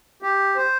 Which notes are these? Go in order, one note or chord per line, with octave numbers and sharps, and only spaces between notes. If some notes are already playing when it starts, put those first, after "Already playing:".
G4
C5